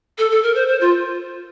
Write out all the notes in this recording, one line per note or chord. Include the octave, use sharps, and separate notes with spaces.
A4
A4
A#4
C5
C5
F4